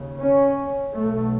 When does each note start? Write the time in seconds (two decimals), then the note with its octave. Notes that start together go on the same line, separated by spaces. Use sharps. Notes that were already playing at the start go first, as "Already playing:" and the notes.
Already playing: D#2 C#3
0.21 C#4
0.94 B1 B2 A3